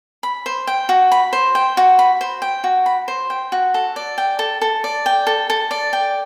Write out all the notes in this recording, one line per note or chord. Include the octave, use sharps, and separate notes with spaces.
B5
C5
G5
F#4
B5
C5
G5
F#4
B5
C5
G5
F#4
B5
C5
G5
F#4
A4
D5
G5
A4
A4
D5
G5
A4
A4
D5
G5